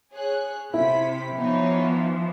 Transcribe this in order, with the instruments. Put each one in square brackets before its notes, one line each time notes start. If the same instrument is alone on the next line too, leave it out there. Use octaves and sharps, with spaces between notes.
[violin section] G#4 C#5 F#6
[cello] C3 [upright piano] E4 [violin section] G5 B5 B6
[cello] E3 F3 [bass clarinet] B3 [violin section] D#4 C#5